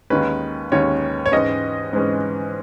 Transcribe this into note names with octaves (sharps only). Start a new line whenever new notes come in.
D#2 D#3 G#3 C#4 B4
D#2 D#3 G#3 C#4 C#5
C#5
G#2 E3 G#3 C#4 D#5
G#2 E3 G#3 C#4